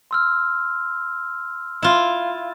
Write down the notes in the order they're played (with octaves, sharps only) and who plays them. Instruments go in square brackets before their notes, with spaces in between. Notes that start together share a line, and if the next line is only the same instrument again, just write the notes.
[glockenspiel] C6 E6 F6
[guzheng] E4 F4